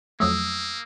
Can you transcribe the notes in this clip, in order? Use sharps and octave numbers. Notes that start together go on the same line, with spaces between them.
F2 F#3 A3 A#3 D#6 E6